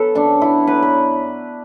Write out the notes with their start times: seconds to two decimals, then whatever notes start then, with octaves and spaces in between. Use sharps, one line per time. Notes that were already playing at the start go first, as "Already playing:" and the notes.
Already playing: F#3 B3 A4 B4
0.15 F#2 D4
0.41 B3 E4
0.67 F#3 B4
0.82 B4